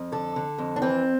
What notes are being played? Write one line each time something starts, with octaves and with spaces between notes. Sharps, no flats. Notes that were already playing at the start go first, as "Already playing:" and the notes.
Already playing: F2
D3 A4
D3
F2
D4
E3 C4